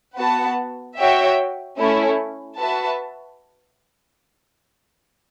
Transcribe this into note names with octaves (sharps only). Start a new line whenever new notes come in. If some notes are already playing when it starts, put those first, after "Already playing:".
B3 F#4 B4 F#5 A5
F#4 C#5 E5 G5
A3 C#4 E4
F#4 B4 E5 A5